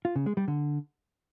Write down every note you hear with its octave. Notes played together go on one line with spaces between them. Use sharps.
F4
C#3
G#3
G3
D3